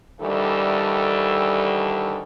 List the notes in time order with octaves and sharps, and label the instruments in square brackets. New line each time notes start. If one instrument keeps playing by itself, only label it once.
[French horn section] D2 D#3 E3 G3 A4